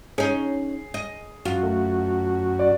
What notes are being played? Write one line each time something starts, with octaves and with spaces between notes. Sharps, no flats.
C#4 D#4 G#4
D#5
F#2 F4 F#4
A3
D5